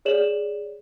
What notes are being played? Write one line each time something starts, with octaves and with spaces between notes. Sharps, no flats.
G#4 C#5 D5 E7 F#7